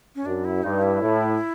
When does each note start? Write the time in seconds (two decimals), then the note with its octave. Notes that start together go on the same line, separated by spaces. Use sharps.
0.15 C#4
0.25 F#2 D4
0.45 E4
0.64 G2 D#4
0.82 E4
1.02 A2